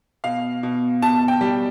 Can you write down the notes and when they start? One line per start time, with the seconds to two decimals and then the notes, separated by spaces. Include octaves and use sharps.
0.24 B2 F5
0.63 B2
1.02 B2 A5
1.28 G5
1.41 G3